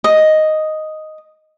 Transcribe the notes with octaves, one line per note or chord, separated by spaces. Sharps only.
D#5